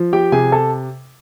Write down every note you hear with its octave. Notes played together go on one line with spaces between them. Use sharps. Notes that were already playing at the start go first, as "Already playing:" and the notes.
Already playing: F3
G4 G5
C3 G#4 G#5
A4 A5